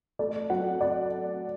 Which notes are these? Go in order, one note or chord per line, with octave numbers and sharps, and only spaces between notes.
A3 D5
F#3 F#5
D5